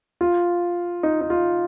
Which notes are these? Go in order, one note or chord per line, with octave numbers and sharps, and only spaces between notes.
F4
D#4
D#4
F4